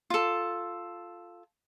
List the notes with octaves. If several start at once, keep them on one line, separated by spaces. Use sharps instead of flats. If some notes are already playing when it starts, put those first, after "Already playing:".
F4 A4